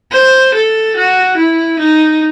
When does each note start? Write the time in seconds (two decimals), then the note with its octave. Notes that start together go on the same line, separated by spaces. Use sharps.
0.12 C5
0.54 A4
0.96 F#4
1.37 E4
1.79 D#4